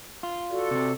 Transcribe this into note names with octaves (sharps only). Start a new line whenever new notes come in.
F4
F#4 A4 D5
C3 C4